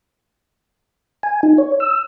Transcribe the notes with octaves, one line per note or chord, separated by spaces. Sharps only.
G#5
D#4
C#5
E6